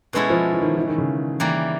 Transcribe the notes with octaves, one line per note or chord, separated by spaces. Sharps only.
B2 G#3 B3 C#4 E4 A4
F3
E3
D#3
E3
D#3
C#3
E3 G3 A#3